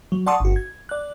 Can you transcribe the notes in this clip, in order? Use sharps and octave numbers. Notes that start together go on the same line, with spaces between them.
F#3
D5 F#5 A5 C6 C#6 D#6
G1 F#4
G#6
D5 F#6